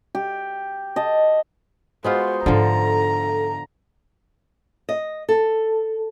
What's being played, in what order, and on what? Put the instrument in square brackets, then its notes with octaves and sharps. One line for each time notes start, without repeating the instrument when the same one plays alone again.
[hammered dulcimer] G4
D#5 A5
[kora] G#3 B3 F4 [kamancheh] F#4 C5 [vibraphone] D#6
[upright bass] G#2 D4 [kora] D3 F3 [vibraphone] A4 [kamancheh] A#5
[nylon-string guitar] D#5
A4